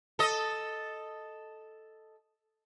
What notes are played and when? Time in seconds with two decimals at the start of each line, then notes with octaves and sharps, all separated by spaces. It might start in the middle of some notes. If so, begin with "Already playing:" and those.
0.19 A4 D#5